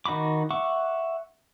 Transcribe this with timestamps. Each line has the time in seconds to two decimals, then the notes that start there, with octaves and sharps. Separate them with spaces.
0.05 D#3 D#4 F#4 B5 D6
0.50 E5 F#5 C#6 D6